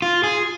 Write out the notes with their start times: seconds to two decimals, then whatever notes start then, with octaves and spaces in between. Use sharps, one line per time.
0.02 F4
0.23 G#4